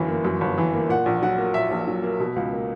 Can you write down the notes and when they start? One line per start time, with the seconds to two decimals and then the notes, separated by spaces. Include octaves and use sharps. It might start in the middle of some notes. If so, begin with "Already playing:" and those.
Already playing: G1 F#2 E3
0.08 A#3
0.25 F#2
0.41 G1
0.58 E3
0.73 A#3
0.89 A#2 F#5
1.06 A#1
1.22 F#3 F#5
1.38 A#3
1.54 A#2 E5
1.71 A#1
1.87 F#3
2.03 A#3
2.20 B2
2.36 C#2
2.53 A#3